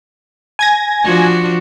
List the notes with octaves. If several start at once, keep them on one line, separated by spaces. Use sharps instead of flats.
G#5 G#6 A#6
F3 D4 F#4